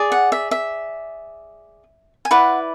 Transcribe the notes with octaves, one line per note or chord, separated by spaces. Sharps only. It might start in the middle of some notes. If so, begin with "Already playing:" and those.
Already playing: G#4 D5
F#5
E5
E5
G#5
E4 B4 D5 F#5